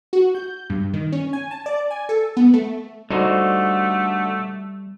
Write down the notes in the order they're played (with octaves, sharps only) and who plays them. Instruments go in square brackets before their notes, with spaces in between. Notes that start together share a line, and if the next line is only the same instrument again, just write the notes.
[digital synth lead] F#4
G6
G2
D#3
C#4
G#5
A5
D5
G#5
A4
B3
A3
[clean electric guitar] D3 [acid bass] G3 [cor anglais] A3 [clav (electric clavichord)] D#4 F#4 C5